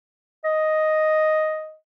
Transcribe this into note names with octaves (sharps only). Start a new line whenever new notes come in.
D#5